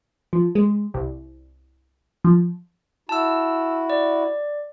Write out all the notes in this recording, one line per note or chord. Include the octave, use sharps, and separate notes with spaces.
F3
G#3
C2
F3
E4 F#4 A5 E6
D5